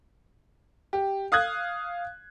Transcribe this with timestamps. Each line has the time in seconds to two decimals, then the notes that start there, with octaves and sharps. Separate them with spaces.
0.93 G4
1.32 F5 D#6 F#6 G#6